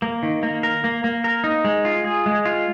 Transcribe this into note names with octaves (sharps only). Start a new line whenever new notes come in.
A#3
D#3
A#3
A#4
A#3
A#3
A#4
D#4
G#3
F4
G#4
G#3
F4